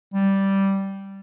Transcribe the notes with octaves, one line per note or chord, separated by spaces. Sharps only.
G3